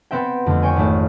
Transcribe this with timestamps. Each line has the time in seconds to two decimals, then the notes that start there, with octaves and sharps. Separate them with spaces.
0.11 B3 C4 E5 G5
0.46 F2 D3 A3
0.62 C#5 G5 G#5
0.76 G#1 A3